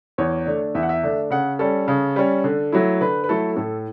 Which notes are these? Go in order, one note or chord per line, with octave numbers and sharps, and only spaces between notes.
E2 C#5
D3 A3 D4
E2 E5
F#5
E5
D3 A3 D4
C#3 F#5
G3 C#4 A4
C#3
G3 C#4
D3
F#3 A3 E4
D3 B4
B4
F#3 A3 E4 A4
A2 A4